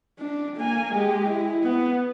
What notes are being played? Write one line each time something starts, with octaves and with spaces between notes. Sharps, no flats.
D4
A#3 G#5
G#3 G4
E4
B3